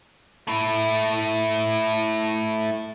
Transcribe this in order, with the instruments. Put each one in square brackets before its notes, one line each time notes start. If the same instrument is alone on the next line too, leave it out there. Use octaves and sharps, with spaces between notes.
[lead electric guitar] A3 E4